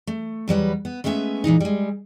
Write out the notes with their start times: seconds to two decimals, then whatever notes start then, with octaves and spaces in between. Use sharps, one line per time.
0.07 A3
0.48 E2 F#3 G3 B4
0.85 B3
1.04 G#3 A3 B3 C#4 E5
1.44 A#2 E3 G#3 D#4
1.60 G3 G#3